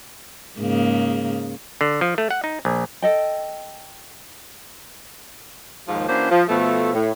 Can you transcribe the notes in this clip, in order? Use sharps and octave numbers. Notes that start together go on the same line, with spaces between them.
G#2 C#3 A#3
D3
F3
A3
F#5
D#4
A#1
A4 D#5 G5
D#2 G#2 F3
E3 A#3 C#4 D4 F#4 C5
F3
B2 F3 A3
A2